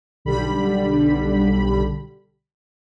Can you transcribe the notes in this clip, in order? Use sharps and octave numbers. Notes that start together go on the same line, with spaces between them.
B1 D3 G3 B5